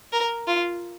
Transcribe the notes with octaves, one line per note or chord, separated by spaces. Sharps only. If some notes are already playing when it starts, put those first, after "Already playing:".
A#4
F4